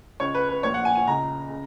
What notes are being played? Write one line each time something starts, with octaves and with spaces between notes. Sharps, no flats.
C#2 C#3 C#5
B4
B4
A#1 A#2 C#5
F#5
G#5
G#5
C#2 C#3 A#5
C#3